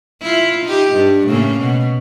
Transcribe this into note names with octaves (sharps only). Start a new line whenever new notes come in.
E4 F4
D#4 G4
G2
A2 C#3 A#3
B2